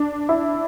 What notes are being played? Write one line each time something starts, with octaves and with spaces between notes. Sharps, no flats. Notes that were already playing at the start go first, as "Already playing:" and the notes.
Already playing: D4
E4